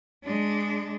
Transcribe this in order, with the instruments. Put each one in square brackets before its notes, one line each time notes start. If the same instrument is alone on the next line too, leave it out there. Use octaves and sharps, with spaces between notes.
[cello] G#3 D4